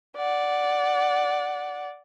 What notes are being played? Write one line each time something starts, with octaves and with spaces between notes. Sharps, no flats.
D5 F#5